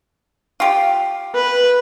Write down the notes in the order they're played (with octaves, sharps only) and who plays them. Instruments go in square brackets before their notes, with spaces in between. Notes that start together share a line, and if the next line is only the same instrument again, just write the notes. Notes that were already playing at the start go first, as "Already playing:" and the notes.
[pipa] F4 G4
[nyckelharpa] B4